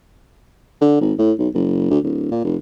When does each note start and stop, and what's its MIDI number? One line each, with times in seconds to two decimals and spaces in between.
0.81 0.97 50
1.01 1.13 32
1.19 1.33 45
1.39 1.48 35
1.54 1.89 30
1.90 1.99 38
2.04 2.29 26
2.31 2.42 46
2.44 2.56 29